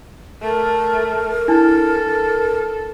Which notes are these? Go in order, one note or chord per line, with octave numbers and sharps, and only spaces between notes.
A3 A#4
D4 E4 A4